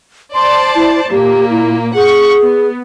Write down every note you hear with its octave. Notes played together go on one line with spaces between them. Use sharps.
C5 D5 A5 C6
E4
A#2 A#3 G4
E4
G#4 F#5 C#6
B3